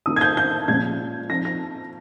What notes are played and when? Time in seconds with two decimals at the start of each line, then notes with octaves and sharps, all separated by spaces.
0.06 D#3 A#3 F4 D#6
0.16 G#6
0.21 G6
0.37 G6
0.68 A#2 F3 G#3 C#4 G#6
1.30 F3 C4 D#4 A#6
1.45 A#6